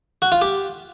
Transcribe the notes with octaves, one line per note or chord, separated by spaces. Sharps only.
F#4
F4
G4